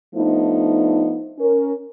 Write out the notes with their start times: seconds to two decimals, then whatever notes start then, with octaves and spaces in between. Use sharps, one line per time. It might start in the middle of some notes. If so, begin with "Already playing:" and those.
0.15 F3 A3 B3 D4 D#4
1.39 C#4 A#4